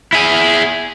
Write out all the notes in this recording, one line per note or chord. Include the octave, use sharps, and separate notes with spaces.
E4 G#4